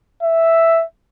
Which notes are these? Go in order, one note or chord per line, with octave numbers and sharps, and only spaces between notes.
E5